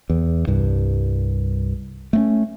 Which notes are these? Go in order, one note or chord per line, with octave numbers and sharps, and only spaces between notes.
E2
C2 G2
A3 A#3 C#4